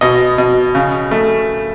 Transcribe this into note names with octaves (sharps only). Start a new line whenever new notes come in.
B2 D#5
B2
C#3
A3